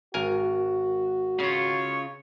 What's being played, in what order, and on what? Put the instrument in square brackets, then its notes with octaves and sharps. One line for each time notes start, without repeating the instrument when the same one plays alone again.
[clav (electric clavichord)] G#1 A#4 G#5 [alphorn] F#4
[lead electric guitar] C#3 F4 [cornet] C#5